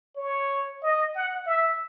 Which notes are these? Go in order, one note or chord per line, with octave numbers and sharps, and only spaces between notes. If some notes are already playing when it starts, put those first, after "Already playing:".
C#5
D#5
F#5
E5